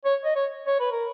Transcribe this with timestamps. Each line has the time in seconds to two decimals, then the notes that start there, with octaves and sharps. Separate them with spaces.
0.05 C#5
0.24 D#5
0.36 C#5
0.66 C#5
0.80 B4
0.92 A#4